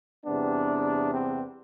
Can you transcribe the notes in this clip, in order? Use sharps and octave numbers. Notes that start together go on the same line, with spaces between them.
E2 C3 G3 B3 D4
C4